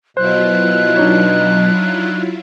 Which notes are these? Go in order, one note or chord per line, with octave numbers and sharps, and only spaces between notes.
B2 F#3 E4 F4 C5 F#6
D4 D#4 C#5